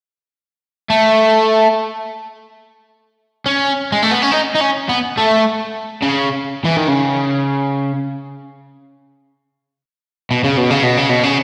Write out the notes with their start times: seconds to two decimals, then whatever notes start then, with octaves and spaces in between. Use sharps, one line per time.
0.90 A3
3.46 C#4
3.92 G#3
4.03 A3
4.11 B3
4.23 C#4
4.32 D#4
4.55 D#4
4.61 C#4
4.89 B3
5.18 A3
6.03 C#3
6.65 E3
6.77 D#3
6.88 C#3
10.31 B2
10.44 C#3
10.57 B2
10.70 C#3
10.83 B2
10.97 C#3
11.09 B2
11.23 C#3